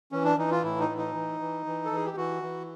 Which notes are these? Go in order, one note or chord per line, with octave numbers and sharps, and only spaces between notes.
E3 C#4
D4
E3 D#4
F4
A2 E4
D#4
E3
D#4
E3
E3
E3
A4
E3
G#4
G4
E3 F#4
E3